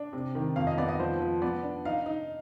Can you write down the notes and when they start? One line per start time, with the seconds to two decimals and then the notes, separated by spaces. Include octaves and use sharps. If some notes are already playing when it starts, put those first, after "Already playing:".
Already playing: D4
0.13 C3
0.35 D#3
0.56 F2 F5
0.67 D#5
0.78 B3 D5
0.88 D#5
1.00 F3 C5
1.21 F3
1.42 B3 D5
1.63 D4
1.85 D#4 F5
2.06 D#4